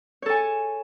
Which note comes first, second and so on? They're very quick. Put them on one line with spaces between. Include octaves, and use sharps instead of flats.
C#5 A4 G#5